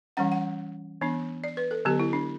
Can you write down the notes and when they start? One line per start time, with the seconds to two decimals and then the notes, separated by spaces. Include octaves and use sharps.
0.17 E3 G3 C#4 F#5
0.32 F#5
1.01 E3 B3 D4
1.44 D5
1.57 B4
1.71 A4
1.85 D3 F#3 B3 G4
2.00 E4
2.13 D4